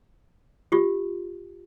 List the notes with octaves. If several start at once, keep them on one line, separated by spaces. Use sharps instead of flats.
F4 G4